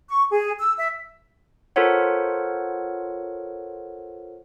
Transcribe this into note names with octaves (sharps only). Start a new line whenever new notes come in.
C#6
G#4
E6
E5
F4 A4 A#4 C5 C#5 F#5